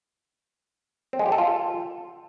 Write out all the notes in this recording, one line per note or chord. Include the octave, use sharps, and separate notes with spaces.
C4
G#3
G4
A4
F4